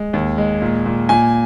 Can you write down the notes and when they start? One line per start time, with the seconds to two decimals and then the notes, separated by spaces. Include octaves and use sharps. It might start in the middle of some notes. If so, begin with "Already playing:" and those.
Already playing: G#3
0.13 D#2
0.38 G#3
0.62 A#2
0.86 A#2
1.09 A#2 G#5